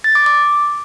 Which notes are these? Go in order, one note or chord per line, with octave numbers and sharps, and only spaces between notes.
A6
D6
D6